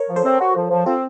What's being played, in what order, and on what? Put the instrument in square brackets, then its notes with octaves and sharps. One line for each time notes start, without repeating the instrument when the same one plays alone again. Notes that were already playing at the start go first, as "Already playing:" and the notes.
Already playing: [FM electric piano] A#4 C#5
[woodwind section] F3
[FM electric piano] A4 C5
[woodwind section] C4
F#4
F3
F3
[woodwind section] C4 [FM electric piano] F4 A4